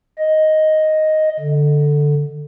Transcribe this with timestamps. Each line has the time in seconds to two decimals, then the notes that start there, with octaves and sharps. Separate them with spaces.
0.18 D#5
1.40 D3